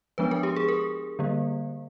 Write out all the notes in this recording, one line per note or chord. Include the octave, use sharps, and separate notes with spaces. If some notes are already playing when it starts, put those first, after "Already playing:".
F3 G#3 B3 D4 B4
A#4
G4
G#4
A#4
D3 G3 A#3